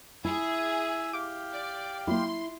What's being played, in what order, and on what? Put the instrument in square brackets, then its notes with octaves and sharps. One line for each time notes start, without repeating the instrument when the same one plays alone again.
[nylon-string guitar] E4 [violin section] G#4 [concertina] E5 G#5
[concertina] G4 F5 G5 [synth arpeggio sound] D6
[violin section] D5
[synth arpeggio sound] F#3 A#3 [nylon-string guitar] E4 [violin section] C6